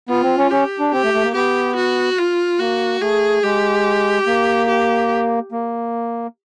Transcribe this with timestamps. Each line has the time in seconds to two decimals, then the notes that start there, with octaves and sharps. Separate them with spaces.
0.09 B3 F4
0.23 C4
0.38 C#4
0.51 C#4 G4
0.79 D4
0.93 C4 G4
1.04 A3
1.14 A3
1.23 A#3
1.34 B3 G4
1.76 F#4
2.18 F4
2.60 A#3 F#4
3.01 A3 G#4
3.43 G#3 G4
4.27 A#3
4.68 G4
5.52 A#3